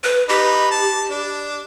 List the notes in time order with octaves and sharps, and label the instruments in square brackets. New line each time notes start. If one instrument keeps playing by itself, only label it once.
[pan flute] B4
[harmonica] D#4 B4 [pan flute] G4
[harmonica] A5
D4